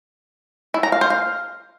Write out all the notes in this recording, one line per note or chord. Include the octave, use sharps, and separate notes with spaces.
E4
A#5
F5
C5
F5